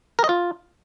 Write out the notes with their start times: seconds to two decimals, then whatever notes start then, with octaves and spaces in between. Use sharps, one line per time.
0.19 A#4
0.24 D#5
0.29 F4